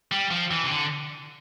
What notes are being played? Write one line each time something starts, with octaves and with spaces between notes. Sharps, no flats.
G3
F3
E3
C3
D3